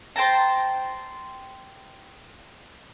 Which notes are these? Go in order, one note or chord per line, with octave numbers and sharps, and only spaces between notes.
C5 G5 A5 A#5